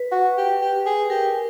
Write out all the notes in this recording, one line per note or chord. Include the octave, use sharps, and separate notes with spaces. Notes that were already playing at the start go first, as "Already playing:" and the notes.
Already playing: B4
F#4
G4
G4
G#4
G4 A#4